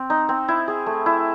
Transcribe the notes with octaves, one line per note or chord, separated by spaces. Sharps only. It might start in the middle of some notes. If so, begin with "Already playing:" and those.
Already playing: C4
D#4
C4
E4
G#4
A3
E4